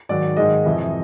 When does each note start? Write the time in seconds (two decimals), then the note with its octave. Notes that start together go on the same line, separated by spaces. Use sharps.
0.09 G#2 D#3 F#3 D5
0.37 G#2 D#3 G#3 D#5
0.66 F2 C3 E3